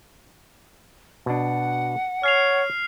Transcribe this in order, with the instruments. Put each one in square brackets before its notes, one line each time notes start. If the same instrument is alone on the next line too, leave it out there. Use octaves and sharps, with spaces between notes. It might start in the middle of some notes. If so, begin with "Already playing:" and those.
[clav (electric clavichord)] B2 D4 [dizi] F#5
[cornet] C#5 [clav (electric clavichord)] G#5 [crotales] F6 C7 F7